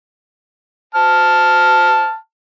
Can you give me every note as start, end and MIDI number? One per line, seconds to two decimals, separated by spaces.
0.95 2.15 81
0.95 2.15 89